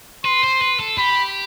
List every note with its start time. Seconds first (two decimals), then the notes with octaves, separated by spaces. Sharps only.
0.25 B4 C6
0.44 C5
0.61 B4
0.80 A4
0.98 G4 B5